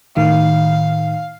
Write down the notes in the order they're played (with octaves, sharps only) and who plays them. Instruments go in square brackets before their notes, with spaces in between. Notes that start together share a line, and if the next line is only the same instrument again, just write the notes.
[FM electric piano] A2 D#3 [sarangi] F5